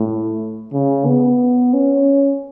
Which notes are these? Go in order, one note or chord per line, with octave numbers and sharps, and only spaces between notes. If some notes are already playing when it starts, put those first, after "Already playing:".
Already playing: A2
C#3
B3
C#4